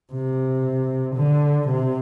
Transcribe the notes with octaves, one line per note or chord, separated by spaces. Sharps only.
C3
D3
C3